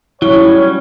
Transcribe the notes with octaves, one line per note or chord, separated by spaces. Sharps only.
F#3 G3 C#4 E4 C#5